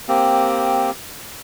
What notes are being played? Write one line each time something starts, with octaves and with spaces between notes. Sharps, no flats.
A#3 C4 G4